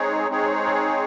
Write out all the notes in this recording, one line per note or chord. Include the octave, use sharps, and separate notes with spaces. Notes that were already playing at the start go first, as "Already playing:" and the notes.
Already playing: G#3 C4 D#4 G#4 C#5
G#3 C4 D#4 G#4 C#5